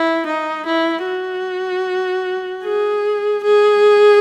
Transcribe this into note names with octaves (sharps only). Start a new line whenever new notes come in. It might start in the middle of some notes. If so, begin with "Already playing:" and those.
Already playing: E4
D#4
E4
F#4
G#4
G#4